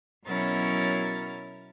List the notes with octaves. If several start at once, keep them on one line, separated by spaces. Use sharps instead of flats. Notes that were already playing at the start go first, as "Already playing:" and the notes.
B2 F#3 C#4 E4 A#4 A6